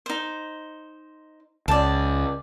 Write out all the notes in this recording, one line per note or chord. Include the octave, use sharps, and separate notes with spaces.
D#4 C5
C#2 D5 A5